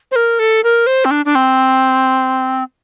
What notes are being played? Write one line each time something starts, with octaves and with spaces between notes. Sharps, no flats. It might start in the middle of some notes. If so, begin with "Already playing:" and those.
C5
A#4
A4
A#4
C5
C4
D4
D4
C4